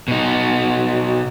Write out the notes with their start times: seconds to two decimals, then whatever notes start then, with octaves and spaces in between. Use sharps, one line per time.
0.08 B2 D#4